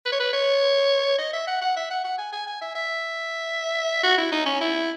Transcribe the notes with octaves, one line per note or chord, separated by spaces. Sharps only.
B4
C#5
B4
C#5
D#5
E5
F#5
F#5
E5
F#5
F#5
G#5
G#5
G#5
E5
E5
F#4
E4
D#4
C#4
E4